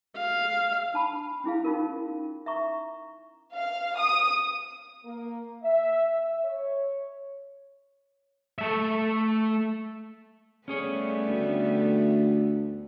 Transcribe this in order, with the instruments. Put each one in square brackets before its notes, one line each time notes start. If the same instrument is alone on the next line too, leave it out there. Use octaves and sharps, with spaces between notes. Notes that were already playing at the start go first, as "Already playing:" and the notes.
[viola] F5
[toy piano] D4 A5 B5
C#4 E4 G#4 F5
C#4 D#4 F4 F#4 A#4
E5 A#5 C#6
[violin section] F5
D#6
[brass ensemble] A#3
E5
E5
C#5
[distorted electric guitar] A3 E5
[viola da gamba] G3 A3 B3 [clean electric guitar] C#4 G#4 C#5
[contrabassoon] D2